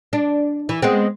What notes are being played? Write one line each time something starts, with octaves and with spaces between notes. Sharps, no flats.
D4
E3
G#3 B3 C4